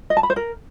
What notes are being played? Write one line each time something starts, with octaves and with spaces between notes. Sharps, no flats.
D#5
A5
B5
C5
A#4